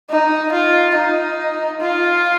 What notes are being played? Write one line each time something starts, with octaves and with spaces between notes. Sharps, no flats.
D#4
F4
D#4
F4